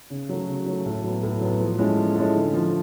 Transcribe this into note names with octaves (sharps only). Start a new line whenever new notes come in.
C#3
F#3 A3
C#3
F#3 A3
A2
F#3 B3
A2
F#3 B3
F3
G#3 C#4 E4 A4
F3
G#3 C#4 E4 A4
D3
F3 A3